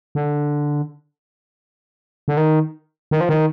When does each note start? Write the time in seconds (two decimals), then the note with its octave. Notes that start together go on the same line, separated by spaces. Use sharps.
0.15 D3
2.28 D3
2.37 D#3
3.11 D#3
3.21 F3
3.29 D#3